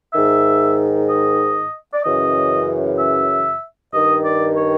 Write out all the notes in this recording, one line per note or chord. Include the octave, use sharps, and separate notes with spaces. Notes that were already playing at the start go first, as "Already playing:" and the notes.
G#2 D#3 E5
D#5
D5
F#2 C#3 E3 D#5
E5
G2 D#3 D#5
D5
C#5